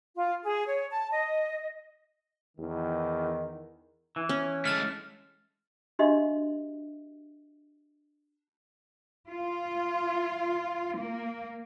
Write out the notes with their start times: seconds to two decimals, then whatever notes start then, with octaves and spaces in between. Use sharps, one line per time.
0.15 F4
0.44 G#4
0.66 C#5
0.91 A5
1.11 D#5
2.57 E2 D#3
4.16 E3
4.29 C#4
4.65 G#3 A3 F6 A6
5.99 D4 F#4 G4 D#5 E5 C6
9.29 F4
10.97 A#3